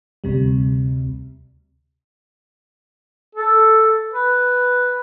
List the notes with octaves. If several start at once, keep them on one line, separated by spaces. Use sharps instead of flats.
D2 C3 G3
A4
B4